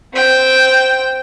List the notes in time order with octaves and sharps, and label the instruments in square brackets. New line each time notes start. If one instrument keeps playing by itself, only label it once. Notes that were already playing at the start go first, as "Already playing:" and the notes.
[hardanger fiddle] C4 G5